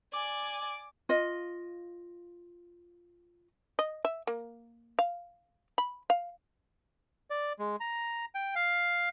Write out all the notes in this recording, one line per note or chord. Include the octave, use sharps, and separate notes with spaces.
D5 G#5 D6
F4 D#5
D#5
E5
A#3
F5
B5
F5
D5
G#3
A#5
G5
F5